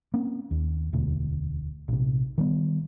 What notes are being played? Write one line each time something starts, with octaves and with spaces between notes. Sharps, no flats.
A#3 C4 C#4
D#2
E1 D2 B2
A#1 C3
D#3 G3 B3